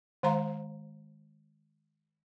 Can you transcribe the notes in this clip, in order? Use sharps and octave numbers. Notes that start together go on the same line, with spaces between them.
D#3 G#3 C5 F5 A#5 C6